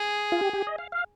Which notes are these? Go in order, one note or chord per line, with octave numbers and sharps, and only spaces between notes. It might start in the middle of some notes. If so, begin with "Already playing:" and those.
Already playing: G#4
F4
G4
G4
D#5
F5
F5